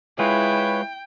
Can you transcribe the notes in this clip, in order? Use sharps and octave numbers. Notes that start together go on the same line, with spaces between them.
G#3 E4 F4 G#4 B4 C#5 G5